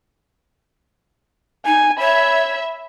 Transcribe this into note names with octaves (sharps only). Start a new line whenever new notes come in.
D#4 G#5
C#5 E5 B5